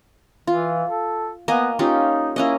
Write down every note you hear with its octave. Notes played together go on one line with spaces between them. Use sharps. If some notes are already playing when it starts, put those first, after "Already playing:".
E3 F4
A4
A#3 B3 D#5 G#5
C#4 D#4 F4 G4
A#3 C#4 E4 D#5